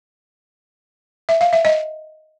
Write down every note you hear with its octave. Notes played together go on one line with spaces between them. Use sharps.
E5
F5
E5
D#5